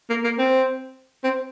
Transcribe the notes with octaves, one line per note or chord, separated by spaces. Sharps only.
A#3
A#3
C4
C4